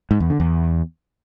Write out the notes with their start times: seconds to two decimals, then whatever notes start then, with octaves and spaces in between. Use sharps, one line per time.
0.11 G#2
0.20 E2
0.30 D3
0.40 E2